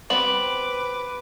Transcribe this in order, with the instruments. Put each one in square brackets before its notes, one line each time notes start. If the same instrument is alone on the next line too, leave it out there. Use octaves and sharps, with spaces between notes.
[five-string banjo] G3 B3 C4 [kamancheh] B4 D6 [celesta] F#7